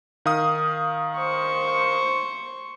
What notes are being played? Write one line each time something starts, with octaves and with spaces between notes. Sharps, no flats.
D#3 F5 D#6
C5 C#6